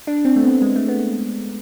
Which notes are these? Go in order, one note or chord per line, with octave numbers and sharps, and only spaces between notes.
D4
C4
A3
B3
G#3
A3
B3